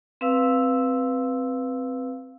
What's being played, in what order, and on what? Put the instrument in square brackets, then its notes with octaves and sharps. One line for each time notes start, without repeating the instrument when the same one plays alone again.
[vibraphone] C4 B4 F5 E6